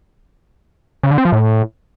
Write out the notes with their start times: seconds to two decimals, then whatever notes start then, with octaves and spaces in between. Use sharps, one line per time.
1.03 C#3
1.11 D3
1.18 C4
1.25 F3
1.32 A2